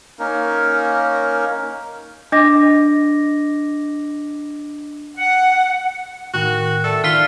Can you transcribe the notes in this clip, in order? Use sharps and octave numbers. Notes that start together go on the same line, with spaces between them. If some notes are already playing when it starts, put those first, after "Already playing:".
A#3 C#4 D#4 A#4
D4 D#5 D6 A#6
F#5
A2 D#3 F#4 A#4 G5
A4 D5 E5 A5
D#3 F4 F6 B6 G7